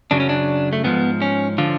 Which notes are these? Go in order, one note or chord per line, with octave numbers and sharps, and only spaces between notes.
F#2 C#3 F#3 D4
C#4
D4
A3
G#2 F3 B3
C#4
D3 F3 F4